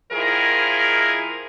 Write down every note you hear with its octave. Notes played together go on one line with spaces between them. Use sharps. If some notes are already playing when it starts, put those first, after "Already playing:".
D#3 F3 E4 G#4 A#4